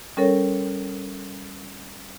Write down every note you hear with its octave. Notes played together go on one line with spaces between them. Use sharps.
G3 C#4 A4 A#4 C#5